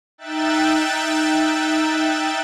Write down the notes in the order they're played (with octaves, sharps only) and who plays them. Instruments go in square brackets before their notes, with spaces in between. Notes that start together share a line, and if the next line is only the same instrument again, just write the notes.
[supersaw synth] D#4 E5 G5 E6 F#6 A6